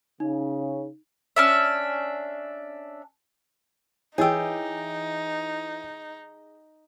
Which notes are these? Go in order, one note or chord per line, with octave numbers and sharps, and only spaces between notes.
C#3 D#4
C#4 D4 E5
E3 D#4 G4 G#4 C#5 D#5 E6